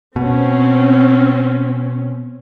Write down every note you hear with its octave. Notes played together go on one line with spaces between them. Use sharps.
B2 C4 C#4